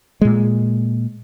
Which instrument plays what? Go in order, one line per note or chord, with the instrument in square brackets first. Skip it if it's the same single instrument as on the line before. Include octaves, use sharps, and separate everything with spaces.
[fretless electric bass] A#2 G#3